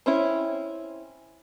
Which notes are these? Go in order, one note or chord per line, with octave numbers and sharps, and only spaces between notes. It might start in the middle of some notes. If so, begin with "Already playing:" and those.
C4 C#4 E4